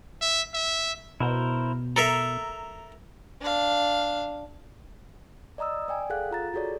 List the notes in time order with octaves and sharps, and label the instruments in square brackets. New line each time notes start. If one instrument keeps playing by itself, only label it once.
[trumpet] E5
E5
[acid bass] B2 [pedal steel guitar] E4 A#4 C5
[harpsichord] A4 A#4 E5 [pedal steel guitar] A#5
[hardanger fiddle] D4 F5
[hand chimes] D5 D#5 A#5 D#6 E6
D5 G5 G#5
G#4 A4 F5 F#5 F#6
F4 A#5 A6
F#4 G#4 A4 C#5 D5